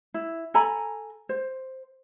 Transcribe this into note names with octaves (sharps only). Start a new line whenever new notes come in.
E4
A4 G#5 A#5 B5
C5